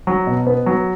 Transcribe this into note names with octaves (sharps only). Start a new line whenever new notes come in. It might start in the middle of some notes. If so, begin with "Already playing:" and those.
F#3
B2
B3
F#3